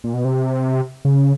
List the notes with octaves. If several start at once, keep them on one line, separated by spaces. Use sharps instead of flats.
A#2
B2
C3
C#3